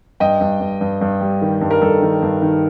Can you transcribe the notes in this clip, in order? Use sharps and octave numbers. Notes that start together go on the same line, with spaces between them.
G2 D#5 G5
G2
G2
G2
G2
G3
D#3
G2
A#4
G2 A4
D#3
G2
D#3